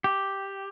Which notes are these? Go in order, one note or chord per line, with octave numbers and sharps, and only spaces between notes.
G4